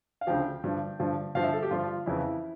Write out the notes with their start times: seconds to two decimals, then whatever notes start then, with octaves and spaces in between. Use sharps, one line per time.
0.21 F5
0.27 D2 C#3 F3 G5
0.64 G2 D3 F3
1.00 G2 D3 F3
1.35 G2 D3 F3 F5
1.44 E5
1.53 A4
1.63 G4
1.71 G2 D3 F3 F4
2.06 F2 C#3 E3 E4